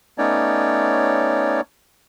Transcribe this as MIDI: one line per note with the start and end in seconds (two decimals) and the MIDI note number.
0.18 1.61 57
0.18 1.61 59
0.18 1.61 61
0.18 1.61 63
0.18 1.61 73
0.18 1.61 74